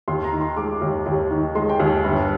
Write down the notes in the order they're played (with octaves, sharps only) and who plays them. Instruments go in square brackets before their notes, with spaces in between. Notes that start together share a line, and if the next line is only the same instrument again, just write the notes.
[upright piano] D#2 C6
A#5
D#3
C6
G#3 D6
D#2
D#2
D#3
G#3 C6
G5
D#2 G#5
G1